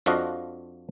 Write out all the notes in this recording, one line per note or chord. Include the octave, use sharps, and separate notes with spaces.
F2 F3 D4 F#4 D#5 F5